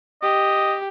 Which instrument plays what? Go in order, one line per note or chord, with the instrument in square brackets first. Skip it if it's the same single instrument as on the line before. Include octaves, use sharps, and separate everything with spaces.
[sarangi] G4 [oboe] D#5